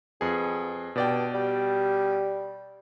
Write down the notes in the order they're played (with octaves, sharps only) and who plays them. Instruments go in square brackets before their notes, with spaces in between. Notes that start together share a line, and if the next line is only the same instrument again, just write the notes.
[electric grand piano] F2 G#4 [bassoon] B2
[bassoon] G2 [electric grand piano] B2 D5 G5
[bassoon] G3